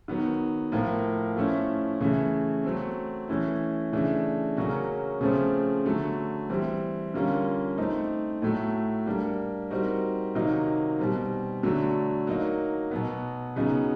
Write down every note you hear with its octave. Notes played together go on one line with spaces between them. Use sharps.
D#3 F#3 B3
A2 F3 A#3
F3 A3 C#4 E4
C#3 E3 A3
F#3 A3 C4
E3 A3 C#4 E4
C#3 E3 A3 D4
C#3 F#3 A#3 C#4 F#4
C#3 F3 A3 C4
D3 F#3 A3
E3 G3 C4
D3 G3 A#3 C#4 F4
A3 C4 D#4
A2 F#3 A3
G3 A#3 D4
G3 C4 D#4 F#4 A#4
C3 D#3 F#3 A#3 D#4
B2 G3 C4
D3 F#3 A3 D4 F#4
F#3 A#3 D#4
B2 F#3 B3
C#3 F#3 B3 D#4